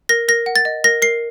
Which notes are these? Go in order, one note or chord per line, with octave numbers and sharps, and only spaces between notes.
A#4 A#6
A#4 A#6
F#5
A6
D#5
A#4 A#6
A#4 C7